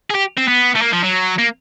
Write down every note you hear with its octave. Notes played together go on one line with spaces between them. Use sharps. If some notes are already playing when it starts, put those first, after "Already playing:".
G#4
G4
C4
B3
A3
A#3
F3
F#3
A#3